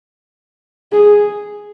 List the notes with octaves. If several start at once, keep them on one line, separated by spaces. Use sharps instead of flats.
G#4